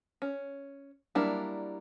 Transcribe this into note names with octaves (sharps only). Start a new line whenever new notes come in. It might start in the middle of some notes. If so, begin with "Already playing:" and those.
C#4
F#3 G3 A#3 D4 E4